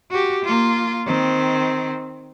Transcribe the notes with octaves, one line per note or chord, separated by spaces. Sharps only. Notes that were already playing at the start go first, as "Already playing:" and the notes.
F#4 G4
A#3 F4
D#3 C4